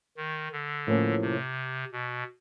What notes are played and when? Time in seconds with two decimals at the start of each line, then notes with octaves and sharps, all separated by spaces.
0.17 D#3
0.52 D3
0.87 A2 F3 A#3 C#4
1.22 C3
1.92 B2